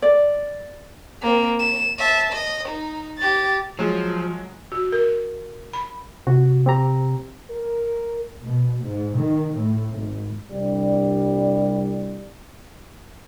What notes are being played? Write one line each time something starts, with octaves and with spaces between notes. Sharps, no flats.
D5
A#3 C4
E7
E5 A5
D#5
D#4
G4 A6
F3 F#3 G#3
F#4
A#4
B5
C3 F#4
C4 G4 A#5
A#4
B2
G#2
D#3
A2
G#1
C2 G3 D4